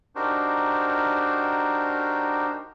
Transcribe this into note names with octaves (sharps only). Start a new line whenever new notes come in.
D4 D#4 F#4 G4 A#4 C5